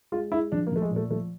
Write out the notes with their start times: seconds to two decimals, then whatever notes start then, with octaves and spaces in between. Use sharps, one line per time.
0.12 G#3 F4
0.32 G#3 E4
0.52 F3 D4
0.67 A#3
0.72 F3 A3
0.82 G#3
0.91 A#2
0.96 A3
1.11 F3 A3